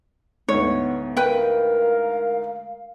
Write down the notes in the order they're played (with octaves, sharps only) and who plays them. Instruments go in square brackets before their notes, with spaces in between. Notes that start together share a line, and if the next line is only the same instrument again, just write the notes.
[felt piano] D2 G#2 [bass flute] B3 [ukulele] C#5
[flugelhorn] A#4 [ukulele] B4 G5 [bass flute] F5